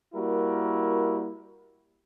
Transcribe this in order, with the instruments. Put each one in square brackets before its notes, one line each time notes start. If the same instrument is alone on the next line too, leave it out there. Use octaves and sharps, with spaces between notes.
[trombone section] G3 A#3 E4 F#4 A#4